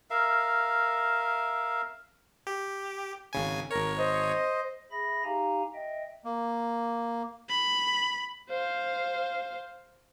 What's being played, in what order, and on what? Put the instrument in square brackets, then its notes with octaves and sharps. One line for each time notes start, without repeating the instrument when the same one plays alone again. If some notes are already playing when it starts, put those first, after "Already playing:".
[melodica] A#4 E5 F5
[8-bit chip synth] G4
G#1 C#3 G#5
[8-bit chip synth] G#1 C#5 [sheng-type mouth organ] A#4
[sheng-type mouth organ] C5 D#5
[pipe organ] G#4 E5 B5 A#6
D#4 G4 F5 G#5 A#5
D#5 E5 G5
[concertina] A#3
[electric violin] B5
C5 F5